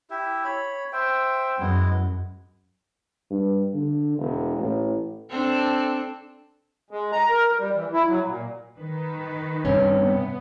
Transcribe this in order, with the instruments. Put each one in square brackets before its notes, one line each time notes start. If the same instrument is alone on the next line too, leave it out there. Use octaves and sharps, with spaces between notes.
[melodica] E4 G4 E5
C#5 B5
C5 E5 G5
[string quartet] F#2 [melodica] G#3 B3 E4
[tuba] G2
D3
E1
A1
[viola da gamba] C4 D4 A4
[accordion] G#3
A#5
A#4
G3
E3
E4
F#3
A#2
[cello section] D#3 B4
[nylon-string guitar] G2 C3 C#4
[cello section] B3